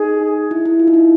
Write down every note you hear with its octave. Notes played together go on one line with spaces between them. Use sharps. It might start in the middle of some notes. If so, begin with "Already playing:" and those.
Already playing: D#4 G#4
E4
E4
F4
D#4
E4